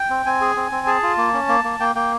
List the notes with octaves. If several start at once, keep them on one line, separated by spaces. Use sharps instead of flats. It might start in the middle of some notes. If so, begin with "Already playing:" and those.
Already playing: G5
C4
C4 G#5
G#4
C4
C4
G#4 A5
F4
A#3
C#4
A#3
A#3
A#3 G5
A#3 G5